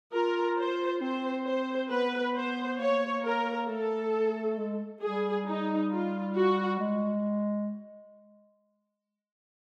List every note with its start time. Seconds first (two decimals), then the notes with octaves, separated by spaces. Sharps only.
0.13 F4 A#4
0.57 C5
1.01 C4 C5
1.47 C5
1.90 B3 B4
2.36 C5
2.80 A#3 C#5
3.24 A#4
3.69 A3 A4
4.58 G#3
5.02 G3 G#4
5.47 D#4
5.91 F4
6.36 F#4
6.79 G#3